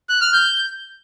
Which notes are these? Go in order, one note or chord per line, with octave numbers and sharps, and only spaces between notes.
F#6
F6
G6